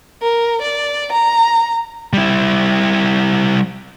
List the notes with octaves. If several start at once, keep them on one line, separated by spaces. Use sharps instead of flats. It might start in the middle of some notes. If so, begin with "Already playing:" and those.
A#4
D5
A#5
G3 E4